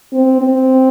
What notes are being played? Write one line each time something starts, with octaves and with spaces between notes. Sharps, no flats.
C4
C4